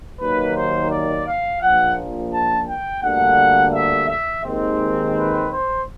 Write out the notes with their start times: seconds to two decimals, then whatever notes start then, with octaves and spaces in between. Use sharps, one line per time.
0.20 D#2 D#3 F#3 A#3 B4
0.56 C5
0.91 D5
1.27 F5
1.62 A#1 A#2 F3 F#5
2.32 A5
2.68 G5
3.03 D2 D3 G3 A#3 F#5
3.73 E5
4.08 E5
4.44 D#2 D#3 G#3 C4
5.15 B4
5.49 C5